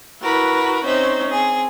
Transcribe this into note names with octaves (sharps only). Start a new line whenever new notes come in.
E4 F#4 A#4 B4
C4 C#4 D#4 C5 E5
C4 G#4